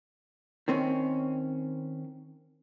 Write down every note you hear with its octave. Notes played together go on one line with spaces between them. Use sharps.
D#3 C4 C#4